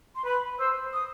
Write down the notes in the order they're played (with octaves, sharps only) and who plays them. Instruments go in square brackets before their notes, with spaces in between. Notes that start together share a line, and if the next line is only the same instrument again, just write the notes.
[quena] C6
[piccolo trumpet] B4 [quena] B5
[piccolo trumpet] C5 [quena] E6
[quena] D#6